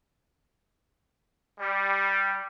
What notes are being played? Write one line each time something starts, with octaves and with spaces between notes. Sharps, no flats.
G3